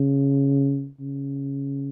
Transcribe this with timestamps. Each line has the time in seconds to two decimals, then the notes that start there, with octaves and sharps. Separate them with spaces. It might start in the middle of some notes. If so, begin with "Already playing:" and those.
Already playing: C#3
1.00 C#3